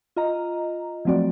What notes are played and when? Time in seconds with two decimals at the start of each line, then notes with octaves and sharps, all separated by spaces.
0.16 F4 D#5 A#5
1.05 F3 F#3 A3 C4 F#4 D5